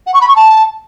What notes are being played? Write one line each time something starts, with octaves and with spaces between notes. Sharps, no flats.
F#5
C#6
B5
C#6
A5